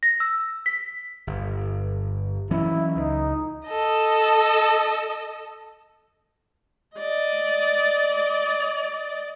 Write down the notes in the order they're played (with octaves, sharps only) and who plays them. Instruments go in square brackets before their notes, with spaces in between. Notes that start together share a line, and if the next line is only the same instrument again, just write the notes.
[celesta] A#6
E6
B6
[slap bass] G1
[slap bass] E3 F#3 C#4 [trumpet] E4
[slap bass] C#2 [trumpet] D#4
[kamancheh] A4 D#5
[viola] D5 D#5